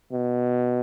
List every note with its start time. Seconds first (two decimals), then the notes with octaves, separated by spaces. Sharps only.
0.12 B2